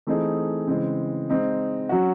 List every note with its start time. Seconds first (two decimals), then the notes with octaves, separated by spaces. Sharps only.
0.07 E3 A3 C4 D#4 G#4
0.68 C#3 E3 G#3 C4
1.29 G#3 C4 D#4
1.89 F#3 C#4 F#4